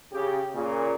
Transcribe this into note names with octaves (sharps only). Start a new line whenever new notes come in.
C#3 G4
A#2 C#3